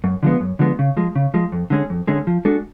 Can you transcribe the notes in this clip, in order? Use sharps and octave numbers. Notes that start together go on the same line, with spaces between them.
F#2
D3 F3 G#3 B3
F#2
D3 F3 G#3 B3
C#3
F3 G#3
C#3
F3 G#3
F2
D3 G#3 C#4 G#4
F2
D3 G#3 C#4 G#4
F3
G#3 D4 F#4 A4